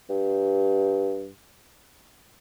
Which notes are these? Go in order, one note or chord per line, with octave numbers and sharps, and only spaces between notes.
G2